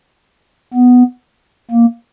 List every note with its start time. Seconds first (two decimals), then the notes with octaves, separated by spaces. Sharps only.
0.73 B3
1.71 A#3